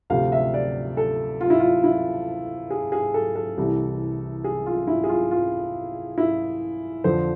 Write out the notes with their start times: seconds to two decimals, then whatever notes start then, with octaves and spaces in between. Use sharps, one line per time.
0.10 D2 C3 F3 F5
0.32 E5
0.54 D5
0.97 A4
1.41 F4
1.50 E4
1.60 F4
1.84 E4
2.71 G#4
2.92 G#4
3.14 A4
3.35 A4
3.57 C2 C3 E3
4.44 G#4
4.66 F4
4.87 E4
5.04 G#4
5.09 F4
5.31 F4
6.18 E4
7.04 F2 D3 F3 C5